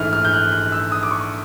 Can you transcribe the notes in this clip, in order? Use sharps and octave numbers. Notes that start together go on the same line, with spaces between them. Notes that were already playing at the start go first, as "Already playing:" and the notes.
Already playing: A#1 G#2 E3 A3 F6
F6
G6
F#6
F#6
E6
D#6
D6
C#6